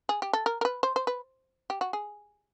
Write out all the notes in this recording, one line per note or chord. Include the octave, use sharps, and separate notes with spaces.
G#4
G4
A4
A#4
A#4
B4
C5
C5
B4
G4
F#4
G#4